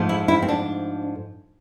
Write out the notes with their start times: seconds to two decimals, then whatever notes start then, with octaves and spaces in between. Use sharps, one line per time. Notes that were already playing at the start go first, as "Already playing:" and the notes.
Already playing: G#2 F3 A3
0.09 E4
0.28 E4
0.42 C4
0.48 D4